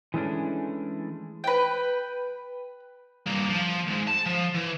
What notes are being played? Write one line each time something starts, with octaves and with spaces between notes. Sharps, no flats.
E3 G#3 A3 C#4 D4
B4 G5
G2 A#3
F3
C#2 G#2
A5
F3
E3